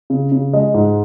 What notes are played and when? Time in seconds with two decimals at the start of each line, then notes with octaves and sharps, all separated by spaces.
0.10 C#3
0.32 C#3
0.53 G#3 D#5
0.74 G#2